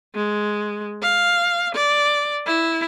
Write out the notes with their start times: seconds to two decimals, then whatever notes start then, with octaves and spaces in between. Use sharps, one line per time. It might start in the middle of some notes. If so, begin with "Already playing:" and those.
0.15 G#3
1.02 F5
1.75 D5
2.46 E4